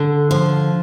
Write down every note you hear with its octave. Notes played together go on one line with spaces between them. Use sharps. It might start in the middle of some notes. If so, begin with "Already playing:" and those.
Already playing: D3
F3